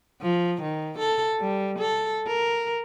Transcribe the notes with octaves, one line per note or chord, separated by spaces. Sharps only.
F3
D#3
A4
G3
A4
A#4